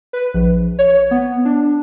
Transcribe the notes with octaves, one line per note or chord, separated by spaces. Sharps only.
B4
A#1
C#5
B3
D4